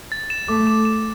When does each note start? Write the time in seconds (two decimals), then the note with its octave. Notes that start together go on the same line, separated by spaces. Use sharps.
0.12 A6
0.30 E7
0.48 A3 D6
0.67 D6
0.85 E7